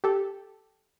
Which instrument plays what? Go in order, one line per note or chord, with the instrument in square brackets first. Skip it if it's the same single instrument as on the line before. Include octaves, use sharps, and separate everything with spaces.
[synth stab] G4 A4